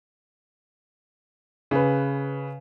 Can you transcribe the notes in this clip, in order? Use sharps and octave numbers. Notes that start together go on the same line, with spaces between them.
C#3 B4